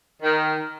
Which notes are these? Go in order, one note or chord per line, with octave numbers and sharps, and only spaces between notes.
D#3